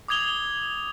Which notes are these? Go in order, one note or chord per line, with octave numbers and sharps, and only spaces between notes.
D6 D#6 G#6 F7 G7